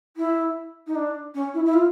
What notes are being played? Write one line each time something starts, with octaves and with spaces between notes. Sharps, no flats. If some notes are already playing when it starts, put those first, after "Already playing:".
E4
D#4
D4
C#4
E4
E4
F4